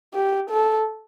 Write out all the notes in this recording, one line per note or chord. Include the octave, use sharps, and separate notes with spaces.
G4
A4